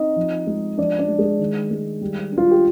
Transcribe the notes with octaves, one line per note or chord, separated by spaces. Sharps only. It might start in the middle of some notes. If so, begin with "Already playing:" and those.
Already playing: C4 D#4 D#5
F3
G#3
F3 D4 D5
D4 D5
G#3
G#3 G#4
D#3
G#3
G3
D4
F4
G4